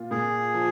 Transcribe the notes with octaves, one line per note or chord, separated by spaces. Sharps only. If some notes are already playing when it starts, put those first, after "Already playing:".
Already playing: A#2 F4
A#2 G#4
F3